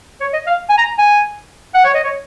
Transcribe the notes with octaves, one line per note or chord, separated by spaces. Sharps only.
C#5
D#5
F5
G#5
A#5
G#5
F#5
C#5
D#5
C#5